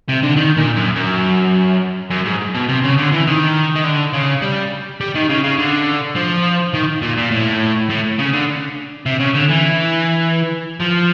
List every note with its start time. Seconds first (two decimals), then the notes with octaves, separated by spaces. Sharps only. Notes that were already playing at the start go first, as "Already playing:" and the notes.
0.09 C3
0.23 D3
0.37 D#3
0.57 A#2
0.76 F#2
0.96 F#2
2.11 F#2
2.25 G#2
2.54 B2
2.68 C3
2.84 C#3
2.98 D3
3.12 E3
3.27 D#3
3.76 D#3
3.84 D3
4.14 C#3
4.42 G3
5.01 G3
5.15 D#3
5.29 C#3
5.44 C#3
5.59 D3
6.16 F3
6.74 D#3
7.03 A#2
7.18 A#2
7.32 A2
7.90 A2
8.19 C#3
8.33 D3
9.06 C3
9.20 C#3
9.35 D3
9.50 E3
10.80 F3